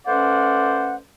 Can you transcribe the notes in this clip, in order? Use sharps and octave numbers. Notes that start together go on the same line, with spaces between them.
A3 C#4 B4 C5 D5 F#5